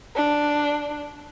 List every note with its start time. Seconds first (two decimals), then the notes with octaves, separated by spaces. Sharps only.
0.16 D4